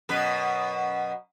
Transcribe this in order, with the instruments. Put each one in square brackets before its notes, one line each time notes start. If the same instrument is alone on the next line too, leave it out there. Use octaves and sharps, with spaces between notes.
[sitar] F#2 B2 B4